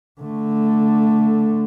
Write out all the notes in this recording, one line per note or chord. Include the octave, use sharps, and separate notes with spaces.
D3 A3